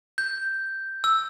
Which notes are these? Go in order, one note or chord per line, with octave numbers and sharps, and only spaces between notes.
G6
E6